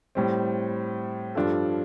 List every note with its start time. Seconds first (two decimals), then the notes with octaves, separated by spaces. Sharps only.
0.15 A2 G3 C4
1.35 G2 F3 D4 F4 A4